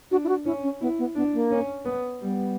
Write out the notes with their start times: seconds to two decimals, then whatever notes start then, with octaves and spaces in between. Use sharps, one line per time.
0.11 D4 F#4
0.24 E4
0.29 F#4
0.45 C#4 E4
0.63 C#4
0.81 B3 E4
0.99 B3
1.15 B3 D4
1.33 A#3
1.51 C#4
1.85 B3
2.20 G3 B3